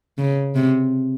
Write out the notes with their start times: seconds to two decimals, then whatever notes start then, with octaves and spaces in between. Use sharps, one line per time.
0.18 C#3
0.55 C3